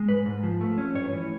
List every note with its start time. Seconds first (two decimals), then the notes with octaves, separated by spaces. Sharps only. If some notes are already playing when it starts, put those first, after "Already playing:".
Already playing: G#3
0.08 G#2 B4
0.26 G#2
0.43 F3
0.61 A3
0.78 C#4
0.95 G2 C#5
1.13 E3